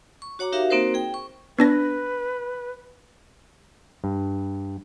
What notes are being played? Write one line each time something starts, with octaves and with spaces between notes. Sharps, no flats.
C#6
F#4 C#5 F#5 A#5 D6
D#4 F#4 G4 A#4 E5 F5
A#3 C4 D#4 F#4 A#4 C5
G#4 G5
C#6
B3 D4 B4 A#6
G2